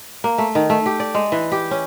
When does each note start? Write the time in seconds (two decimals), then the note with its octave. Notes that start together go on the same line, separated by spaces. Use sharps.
0.24 A#3
0.38 A3
0.55 D#3
0.70 A3
0.86 G4
1.00 D5
1.15 G#3
1.32 E3
1.52 G4
1.71 C#4